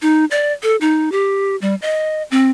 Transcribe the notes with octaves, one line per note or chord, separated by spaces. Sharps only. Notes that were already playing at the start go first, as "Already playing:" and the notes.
D#4
D5
A4
D#4
G4
G3
D#5
C4